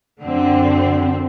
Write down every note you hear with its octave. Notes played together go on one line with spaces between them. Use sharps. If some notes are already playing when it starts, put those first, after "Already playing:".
F#2 D3 C4